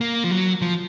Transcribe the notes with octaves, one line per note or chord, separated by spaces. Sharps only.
A#3
F3
F#3
F3